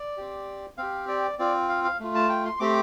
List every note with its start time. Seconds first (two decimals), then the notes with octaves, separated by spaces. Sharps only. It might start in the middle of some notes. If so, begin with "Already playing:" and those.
Already playing: D5
0.17 C4 G4
0.78 C4 G4 F5
1.08 D5
1.39 C4 F4 D5
1.69 F5
1.84 F5
2.00 A3 F4
2.15 A5
2.29 G5
2.45 C6
2.60 A3 C4 G4 D6